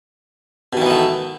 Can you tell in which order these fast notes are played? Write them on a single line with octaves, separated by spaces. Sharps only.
B2 D#3 E3 B3 A3